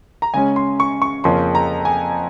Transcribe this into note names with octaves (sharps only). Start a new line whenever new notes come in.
A#5
C#3 G#3 C#4 G#5
C6
C#6
C#6
F2 C#3 F3 A#3 C#4 C6
A#5
G#5